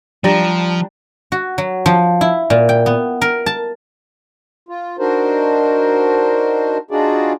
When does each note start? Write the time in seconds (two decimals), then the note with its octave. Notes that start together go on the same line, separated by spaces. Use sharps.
0.24 F3 G3 D4 C5 A#5
1.32 F#4
1.58 F#3
1.86 F3
2.21 E4
2.50 A#2
2.69 G5
2.86 B3
3.21 A#4
3.46 A5
4.69 F4
4.99 D4 D#4 F#4 A#4 C5
6.91 D4 D#4 F4 F#4 G#4 D5